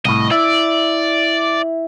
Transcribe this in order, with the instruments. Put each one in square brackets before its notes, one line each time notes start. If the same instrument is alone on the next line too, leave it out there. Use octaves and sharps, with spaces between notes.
[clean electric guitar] C2 A2 [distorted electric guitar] D#5
[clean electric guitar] E4 E5 [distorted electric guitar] D5